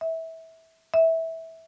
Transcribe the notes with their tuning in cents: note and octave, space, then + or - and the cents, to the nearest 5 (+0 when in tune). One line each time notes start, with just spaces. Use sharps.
E5 -20
E5 -15